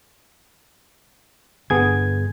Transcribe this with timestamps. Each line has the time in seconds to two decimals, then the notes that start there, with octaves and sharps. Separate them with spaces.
1.70 G2 D3 B3 G#4 G#6